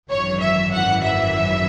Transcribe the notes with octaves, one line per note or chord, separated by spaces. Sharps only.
G#1 F#2 E3 C#5
E5
F#5
E5